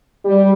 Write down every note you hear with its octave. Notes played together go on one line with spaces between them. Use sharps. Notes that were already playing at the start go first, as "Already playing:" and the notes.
G3